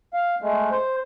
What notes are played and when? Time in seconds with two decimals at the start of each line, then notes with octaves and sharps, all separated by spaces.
0.13 F5
0.42 G#3 A3
0.71 C5